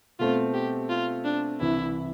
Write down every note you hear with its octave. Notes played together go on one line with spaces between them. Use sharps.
B2 A3 C4 F4
G4
F4
D4
C2 C3 E3 E4